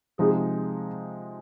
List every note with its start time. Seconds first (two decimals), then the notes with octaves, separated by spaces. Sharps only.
0.19 C3 F3 G#3 D#4 G#4